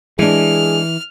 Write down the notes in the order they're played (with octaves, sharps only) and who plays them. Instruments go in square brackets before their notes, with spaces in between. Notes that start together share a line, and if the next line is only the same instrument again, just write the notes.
[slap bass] E3 [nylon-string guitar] G#3 D4 [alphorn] G#4 [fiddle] F6